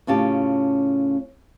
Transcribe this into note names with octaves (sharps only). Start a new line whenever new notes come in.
A2 C#3 C#4 F4 G4 A5